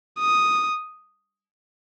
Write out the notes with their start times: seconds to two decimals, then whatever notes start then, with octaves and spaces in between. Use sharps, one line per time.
0.19 D#6